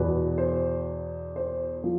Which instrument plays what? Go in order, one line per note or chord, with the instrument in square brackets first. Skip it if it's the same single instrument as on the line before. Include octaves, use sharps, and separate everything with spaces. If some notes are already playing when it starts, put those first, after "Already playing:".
Already playing: [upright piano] E2 B2 B4
C5
C5
F3